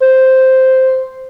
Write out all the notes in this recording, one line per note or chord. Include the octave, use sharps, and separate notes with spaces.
C5